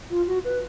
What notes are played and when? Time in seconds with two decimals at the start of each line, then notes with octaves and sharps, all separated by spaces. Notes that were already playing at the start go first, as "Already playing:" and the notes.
0.10 F4
0.27 F#4
0.44 B4